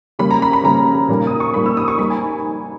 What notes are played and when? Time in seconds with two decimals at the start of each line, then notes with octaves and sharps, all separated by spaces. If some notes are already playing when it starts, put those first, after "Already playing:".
0.19 C#3 G3 A#3 B5
0.30 A#5
0.42 B5
0.53 B5
0.64 C#3 G3 A#3 A#5
1.08 A#2 G3 A#3 D#4
1.27 D#6
1.40 C#6
1.53 A#2 G3 A#3 D#4 B5
1.66 E6
1.77 D#6
1.88 C#6
1.98 G3 A#3 D#4 B5
2.10 G#5